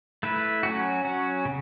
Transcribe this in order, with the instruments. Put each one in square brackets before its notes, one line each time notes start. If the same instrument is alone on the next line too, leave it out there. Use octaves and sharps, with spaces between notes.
[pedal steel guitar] A3 E4 B4
F#3 C#4 F#4
F#3 C#4 F#4
C#3